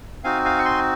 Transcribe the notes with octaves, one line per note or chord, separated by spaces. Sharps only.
C4 D#4 F#4 F5 G#5
F5 G#5
C#6
G#5 C6